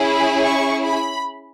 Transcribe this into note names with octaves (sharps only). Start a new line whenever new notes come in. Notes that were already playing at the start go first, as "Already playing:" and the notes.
Already playing: C#4 E4 G#4
B5
C#6
B5